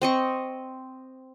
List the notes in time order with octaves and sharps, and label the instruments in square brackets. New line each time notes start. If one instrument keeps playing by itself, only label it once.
[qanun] C4 D#5 C#6